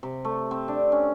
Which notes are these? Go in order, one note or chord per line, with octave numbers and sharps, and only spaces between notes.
C3
A3
C4
D4
C#4